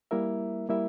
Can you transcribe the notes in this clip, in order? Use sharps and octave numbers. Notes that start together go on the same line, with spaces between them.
G3 A#3 E4 A#4 E5
G3 A#3 E4 A#4 E5